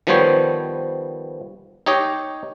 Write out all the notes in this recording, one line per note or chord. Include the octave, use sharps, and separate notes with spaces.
D#3 F3 G3 B3 C5 C#5
D#4 G4 C#5 D#5